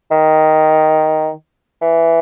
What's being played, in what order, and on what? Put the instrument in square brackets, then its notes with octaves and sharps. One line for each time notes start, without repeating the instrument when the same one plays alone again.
[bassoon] D#3
E3